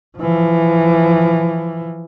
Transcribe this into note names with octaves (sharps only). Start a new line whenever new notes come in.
E3 F3